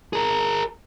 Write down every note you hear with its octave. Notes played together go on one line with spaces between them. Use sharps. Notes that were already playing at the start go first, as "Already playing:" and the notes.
G#4 A#4